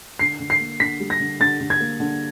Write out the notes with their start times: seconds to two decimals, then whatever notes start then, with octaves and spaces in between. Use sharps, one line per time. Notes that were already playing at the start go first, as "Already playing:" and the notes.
0.19 D3 C7
0.40 D3
0.50 C7
0.60 A#3
0.80 D3 B6
1.00 G3
1.10 A#6
1.20 D3
1.40 D3 A6
1.60 D3
1.70 G#6
1.80 A#3
2.00 D3